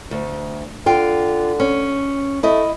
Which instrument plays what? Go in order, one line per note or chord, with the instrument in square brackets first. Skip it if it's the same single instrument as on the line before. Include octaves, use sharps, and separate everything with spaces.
[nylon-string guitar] D2
[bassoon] D3 [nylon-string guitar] F4 G5
[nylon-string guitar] C#4
[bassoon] A3 [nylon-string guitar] E4 D#5